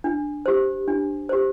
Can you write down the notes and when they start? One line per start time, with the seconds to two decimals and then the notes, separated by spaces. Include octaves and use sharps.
0.04 D4
0.46 G4 C5
0.88 D4
1.29 G4 C5